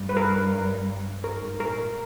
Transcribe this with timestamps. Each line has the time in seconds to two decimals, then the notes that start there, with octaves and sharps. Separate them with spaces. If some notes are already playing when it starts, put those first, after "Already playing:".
Already playing: G2
0.09 B4
0.17 A#4
1.23 G#2 A#4
1.59 A#2 A#4